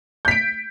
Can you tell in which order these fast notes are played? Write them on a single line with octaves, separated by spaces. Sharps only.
G6 B6 D7